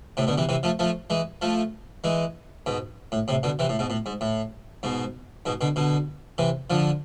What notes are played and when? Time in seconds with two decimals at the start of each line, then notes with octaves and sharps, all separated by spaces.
0.17 A2 C3
0.27 B2 D3
0.38 C3 E3
0.49 C3 E3
0.63 F3 A3
0.79 F3 A3
1.10 E3 G#3
1.42 F3 A3
2.04 E3 G#3
2.66 G#2 B2
3.12 A2
3.28 A2 C3
3.43 B2 D3
3.59 C3 E3
3.69 A2
3.79 G#2 B2
3.90 A2
4.06 G#2
4.21 A2
4.83 G#2 B2
5.46 G#2 B2
5.61 B2 D3
5.76 B2 D3
6.38 C3 E3
6.70 D3 F3